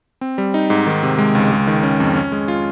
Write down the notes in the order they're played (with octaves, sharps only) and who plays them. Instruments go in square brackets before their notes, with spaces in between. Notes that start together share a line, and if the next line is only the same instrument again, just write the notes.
[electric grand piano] C4
G3
D#4
G#2
D#3
C3
G#3
C#2
G#3
D#3
C#4
F2
C#4
G#3
F4